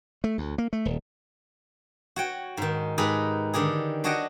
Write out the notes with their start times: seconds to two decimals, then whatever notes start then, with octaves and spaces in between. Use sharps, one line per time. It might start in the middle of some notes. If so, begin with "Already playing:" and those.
0.24 A3
0.38 D2
0.58 A#3
0.73 A3
0.85 D#1
2.16 F#4 C#5 G5
2.57 G#2 D#3
2.98 G#2 G#3 D#4 G4 G#4 B4
3.54 D3 D#3 G4 G#4
4.04 D4 F#4 C#5 D#5 F#5 G5